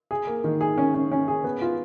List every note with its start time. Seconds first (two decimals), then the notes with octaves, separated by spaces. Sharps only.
0.11 G#4
0.27 A#3
0.44 D#3
0.61 G#4
0.78 C#4
0.94 C#4
1.12 C#4
1.28 G#4
1.44 B3
1.62 F4